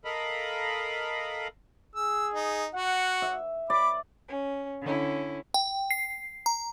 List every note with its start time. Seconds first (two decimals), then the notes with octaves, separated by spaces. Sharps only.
0.05 A4 A#4 D#5 F5 B5
1.95 G#4 E6
2.34 D#4
2.75 F#4 F#5
3.22 E5
3.70 D5 B5 D6
4.28 C#4
4.82 D3 C#4 E4
5.54 G5
5.91 C7
6.46 A#5